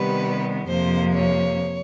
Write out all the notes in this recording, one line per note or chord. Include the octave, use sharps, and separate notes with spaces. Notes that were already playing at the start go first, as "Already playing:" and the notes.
Already playing: C3 D#3 G3 B3 B4
F2 C3 F3 A#3 C5
C#5